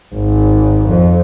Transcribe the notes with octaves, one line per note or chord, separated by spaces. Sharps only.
G#1
F2